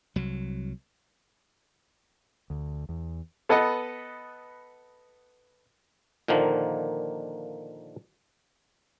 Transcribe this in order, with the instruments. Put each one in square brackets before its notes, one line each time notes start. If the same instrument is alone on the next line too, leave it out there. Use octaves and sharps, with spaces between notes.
[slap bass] C2 F#3
[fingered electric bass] D2
E2
[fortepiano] B3 A4 B4 D#5 F#5
[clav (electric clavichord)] A#2 D3 D#3 F3 A#3